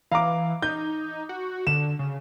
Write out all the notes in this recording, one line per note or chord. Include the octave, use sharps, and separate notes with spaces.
E3 F5 A#5 D6
D#4 G6
F#4
D3 E7
C#3